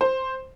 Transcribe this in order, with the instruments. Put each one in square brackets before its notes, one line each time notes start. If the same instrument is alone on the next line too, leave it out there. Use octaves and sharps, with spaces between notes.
[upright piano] C5